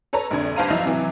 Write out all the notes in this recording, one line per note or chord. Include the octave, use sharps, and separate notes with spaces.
A4 B4 C#5 A5 A#5
A#1 F2 D3 G#6
G1 G2 C5 F5 A#5 D#7
F3 F#3 E4 D#5 F5
C3 E3 F#3